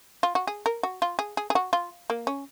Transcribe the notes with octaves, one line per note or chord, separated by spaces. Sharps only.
F4
F#4
G#4
A#4
F#4
F4
G#4
G#4
G#4
F#4
F4
A#3
C#4